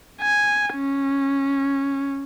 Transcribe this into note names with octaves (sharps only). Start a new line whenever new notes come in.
G#5
C#4